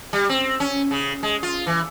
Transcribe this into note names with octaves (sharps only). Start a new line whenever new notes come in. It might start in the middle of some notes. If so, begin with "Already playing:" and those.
G3
C4
C#4
C#3
G#3
F4
E3